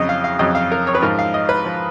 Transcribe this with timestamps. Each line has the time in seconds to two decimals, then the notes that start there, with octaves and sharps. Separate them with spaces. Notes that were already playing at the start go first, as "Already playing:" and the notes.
Already playing: F2 C#3 F#3 D#5
0.09 F5
0.24 F5
0.39 F2 C#3 F#3 D#5
0.55 F5
0.72 A#4
0.87 C#5
0.95 B4
1.02 G#2 F3 A#4
1.19 F5
1.34 D#5
1.49 B4
1.65 F3